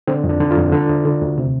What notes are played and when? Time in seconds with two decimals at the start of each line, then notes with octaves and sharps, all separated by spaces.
0.07 D3 C4
0.24 F2
0.29 D4
0.40 D3
0.50 F4
0.56 F2
0.72 D3
0.89 D2
1.05 D3
1.21 D2
1.38 C3